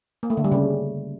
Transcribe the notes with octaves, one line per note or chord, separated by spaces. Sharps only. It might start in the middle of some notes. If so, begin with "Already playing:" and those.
A#3
A3
D3
G3
C#3